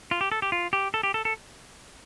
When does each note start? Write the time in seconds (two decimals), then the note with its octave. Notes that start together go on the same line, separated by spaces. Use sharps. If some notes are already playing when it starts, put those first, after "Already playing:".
0.11 F4
0.21 G4
0.32 A4
0.42 G4
0.52 F4
0.73 G4
0.94 A4
1.03 G4
1.14 A4
1.25 A4